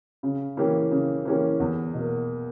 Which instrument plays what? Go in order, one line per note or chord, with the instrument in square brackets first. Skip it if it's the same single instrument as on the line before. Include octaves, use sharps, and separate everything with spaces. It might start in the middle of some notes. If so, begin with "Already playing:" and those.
[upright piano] C#3
E3 A#3 C#4 G4
C#3
E3 A#3 C#4 G4
E2
B2 A#3